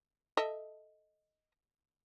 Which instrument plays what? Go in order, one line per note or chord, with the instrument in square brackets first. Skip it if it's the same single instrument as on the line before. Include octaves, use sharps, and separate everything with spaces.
[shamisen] A4 D#5 E5